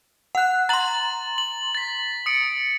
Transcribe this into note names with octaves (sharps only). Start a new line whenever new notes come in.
F#5 F#6
A#5 C6 A6 F#7
F#7
A6 B6
D#6 C#7 D7